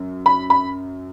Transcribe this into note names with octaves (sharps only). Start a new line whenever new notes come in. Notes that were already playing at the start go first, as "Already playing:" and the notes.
Already playing: F#2
B5
B5